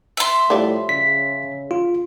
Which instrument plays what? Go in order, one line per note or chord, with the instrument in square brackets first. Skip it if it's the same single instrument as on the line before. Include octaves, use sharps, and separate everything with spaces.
[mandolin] E5 C6
[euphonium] A2 [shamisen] F3 G3 D5
[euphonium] C#3 [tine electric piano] B6
[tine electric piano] F4